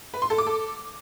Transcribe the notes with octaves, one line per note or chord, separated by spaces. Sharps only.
B4
C6
A4
D6
A4